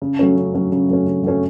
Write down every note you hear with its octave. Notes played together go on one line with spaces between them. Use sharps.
C#3
F#3 A3 C#4
C#3
F#3 A3 C#4
C#3
F#3 A3 C#4
C#3
F#3 A3 C#4